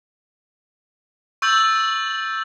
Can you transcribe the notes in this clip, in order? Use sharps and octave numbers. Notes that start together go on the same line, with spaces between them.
C#6 E6 G6 A6 F#7